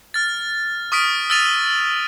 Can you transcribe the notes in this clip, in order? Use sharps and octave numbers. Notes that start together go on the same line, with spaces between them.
F6 A6
C#6 D#6 F6 B6 D7
E6 F6 A6 D#7 F7